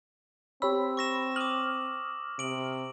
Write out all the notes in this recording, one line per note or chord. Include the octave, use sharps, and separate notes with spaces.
C4 G4 C#5 B5 E6
C#6 A#6 E7
D6 D#6 F6 F#7
C3 D7 F#7